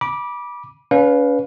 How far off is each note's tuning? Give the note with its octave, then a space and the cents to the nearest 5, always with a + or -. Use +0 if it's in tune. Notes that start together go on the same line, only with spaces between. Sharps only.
B5 -25 D6 +0
C#4 +40 B4 +0 F5 +20